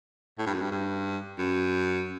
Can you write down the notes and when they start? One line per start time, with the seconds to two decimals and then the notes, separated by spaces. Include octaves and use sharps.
0.39 A2
0.46 G2
0.54 F#2
0.62 G2
0.72 G2
1.38 F#2